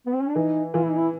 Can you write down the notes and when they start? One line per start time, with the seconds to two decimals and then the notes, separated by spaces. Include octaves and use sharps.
0.06 B3
0.14 C4
0.21 C#4
0.28 D4
0.35 E3 D#4
0.74 E3 F4
0.82 E4
0.90 D#4
0.97 E4